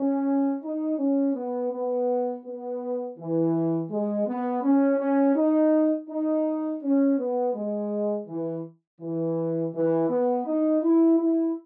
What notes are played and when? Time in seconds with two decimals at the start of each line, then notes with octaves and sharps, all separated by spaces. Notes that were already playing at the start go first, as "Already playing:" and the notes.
Already playing: C#4
0.63 D#4
0.98 C#4
1.35 B3
1.72 B3
2.44 B3
3.18 E3
3.90 G#3
4.27 B3
4.63 C#4
4.99 C#4
5.35 D#4
6.10 D#4
6.82 C#4
7.18 B3
7.54 G#3
8.27 E3
9.01 E3
9.74 E3
10.09 B3
10.46 D#4
10.83 E4
11.19 E4